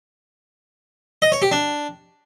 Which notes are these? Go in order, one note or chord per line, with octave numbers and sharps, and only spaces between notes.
D#5
C#5
G4
D4